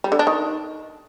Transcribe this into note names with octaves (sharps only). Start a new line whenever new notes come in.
G3
D3
D4
D#3